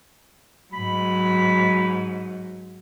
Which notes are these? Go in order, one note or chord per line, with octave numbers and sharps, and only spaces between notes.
G#2 F#3 B5